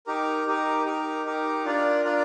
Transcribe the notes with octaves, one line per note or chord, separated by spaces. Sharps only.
D#4 G4 A#4
D#4 G4 A#4
D#4 G4 A#4
D#4 G4 A#4
D4 F4 A#4 D5
D4 F4 A#4 D5